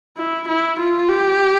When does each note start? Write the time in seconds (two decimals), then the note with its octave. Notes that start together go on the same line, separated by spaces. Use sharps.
0.17 E4
0.48 E4
0.79 F4
1.09 G4